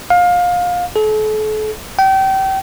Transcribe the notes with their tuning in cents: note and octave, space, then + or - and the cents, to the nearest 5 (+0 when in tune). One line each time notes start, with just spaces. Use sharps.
F5 +25
A4 -40
G5 -30